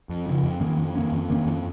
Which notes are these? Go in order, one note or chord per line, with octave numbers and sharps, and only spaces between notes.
F2
C#3 F3
F2
D#3 A#3 C#4
F2
D#3 A#3 C#4
F2
D#3 A#3 C#4
F2